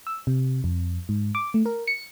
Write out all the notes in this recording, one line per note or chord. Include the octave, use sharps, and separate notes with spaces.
E6
C3
F2
G#2
D6
A3
A#4
C#7